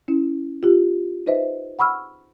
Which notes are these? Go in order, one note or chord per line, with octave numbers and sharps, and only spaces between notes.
C#4 E4
F4 G4
D#4 B4 C5 D#5 E5
F#5 B5 C#6 E6 F6